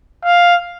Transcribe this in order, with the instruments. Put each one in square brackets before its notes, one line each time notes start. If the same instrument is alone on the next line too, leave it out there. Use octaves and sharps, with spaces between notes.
[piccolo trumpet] F5